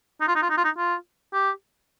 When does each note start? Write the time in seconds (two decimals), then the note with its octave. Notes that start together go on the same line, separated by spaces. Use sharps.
0.21 D#4
0.28 F4
0.36 D#4
0.42 F4
0.50 D#4
0.57 F4
0.64 D#4
0.78 F4
1.33 G4